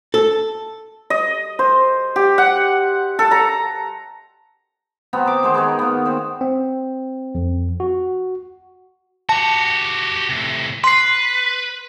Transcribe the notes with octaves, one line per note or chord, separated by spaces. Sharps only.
A4
D#5
C5
G4
F#5
A4
A#5
B3 C4 F#4 A#5
C5 D6
D#3 G#3 C5
B3 D#4 G#4 C#5
A#3 B3
C4 F#4 C5
C4
F2
F#4
F#4 G4 A5
A2 C3
B4 C6 C7